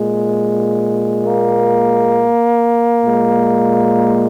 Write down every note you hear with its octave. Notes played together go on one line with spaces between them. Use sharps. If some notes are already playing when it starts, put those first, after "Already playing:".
Already playing: A#2 G#3
A#3
A#2 G#3